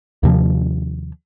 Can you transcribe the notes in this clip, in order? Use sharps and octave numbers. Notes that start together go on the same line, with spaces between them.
D#2 C3 F3